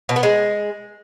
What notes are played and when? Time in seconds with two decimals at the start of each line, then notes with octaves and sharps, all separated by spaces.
0.09 B2
0.16 B3
0.23 G#3